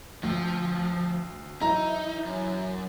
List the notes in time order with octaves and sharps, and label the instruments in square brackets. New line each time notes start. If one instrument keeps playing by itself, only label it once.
[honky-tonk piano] D2 [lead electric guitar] F3
[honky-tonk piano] E3 F#3 E4 [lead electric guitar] D#4 [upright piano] A#5
[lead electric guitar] F#2